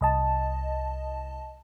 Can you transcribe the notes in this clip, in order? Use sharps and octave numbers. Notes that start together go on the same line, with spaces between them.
C2 D#5 A5